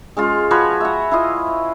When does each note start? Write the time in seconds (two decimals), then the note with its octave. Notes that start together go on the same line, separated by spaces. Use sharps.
0.17 G#3 C#4 F4
0.51 F3 F#4 B4 C#5
0.81 E5 F#5
1.11 E4 F4 D#5